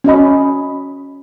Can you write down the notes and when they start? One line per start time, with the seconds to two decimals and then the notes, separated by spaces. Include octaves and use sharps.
0.04 C#4 F#4 D#5 B5